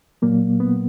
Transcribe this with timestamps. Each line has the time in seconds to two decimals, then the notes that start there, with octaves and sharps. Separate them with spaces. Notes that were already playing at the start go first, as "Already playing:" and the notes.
0.22 A#2 F#3 A#3
0.60 B3